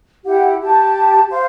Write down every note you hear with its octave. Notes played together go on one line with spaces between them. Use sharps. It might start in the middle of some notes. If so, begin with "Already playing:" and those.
E4 G4 F#5
G4 A5
C5 F5